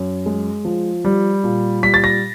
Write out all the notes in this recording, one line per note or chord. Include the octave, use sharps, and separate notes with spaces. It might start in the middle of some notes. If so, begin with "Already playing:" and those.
Already playing: F#2
G#3
F3
G3
A#2
G3 B6
A6
A#6